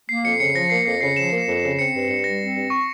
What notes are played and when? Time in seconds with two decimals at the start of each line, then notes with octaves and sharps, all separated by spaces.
0.09 A#3 C7
0.25 F2 C#7
0.40 C#3 C#7
0.54 F3 A#6
0.70 A#3 C7
0.86 F2 C7
1.01 C#3 C7
1.16 F3 E7
1.32 A#3
1.47 F2
1.63 C#3
1.78 C4 C#7
1.94 G2
2.10 G2
2.24 G3 A#6
2.40 C4
2.55 G2
2.70 C#6